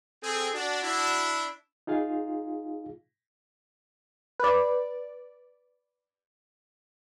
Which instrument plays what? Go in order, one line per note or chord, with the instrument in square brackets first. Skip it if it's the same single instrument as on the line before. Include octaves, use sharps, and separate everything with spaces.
[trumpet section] C4 G#4 [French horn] A4
[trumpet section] D4 [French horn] F#4
[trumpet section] D4 E4
[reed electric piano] D#4 F4 G#4 F5
[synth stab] B4 D5